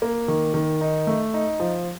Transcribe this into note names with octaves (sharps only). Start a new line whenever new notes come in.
A#3
D#3
D#3
D#4
A3
D#4
F3